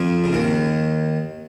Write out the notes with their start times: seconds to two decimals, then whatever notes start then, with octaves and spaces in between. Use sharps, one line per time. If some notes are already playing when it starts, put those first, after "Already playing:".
Already playing: F2 F3
0.24 C#3
0.33 D#2 D#3